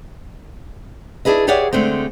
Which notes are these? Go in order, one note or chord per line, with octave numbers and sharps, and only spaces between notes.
D4 E4 G#4 B4 D#5
G4 G#4 C#5 D5 E5 F#5
D3 G#3 A3 C4